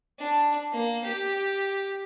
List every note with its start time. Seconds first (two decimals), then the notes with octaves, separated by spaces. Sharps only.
0.19 D4
0.72 A#3
1.04 G4